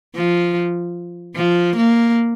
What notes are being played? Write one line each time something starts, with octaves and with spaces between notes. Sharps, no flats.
F3
F3
A#3